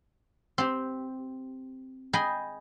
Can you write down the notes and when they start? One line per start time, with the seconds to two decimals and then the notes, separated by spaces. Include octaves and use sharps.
0.58 C4 G4
2.13 G#4 D#5 G5 B5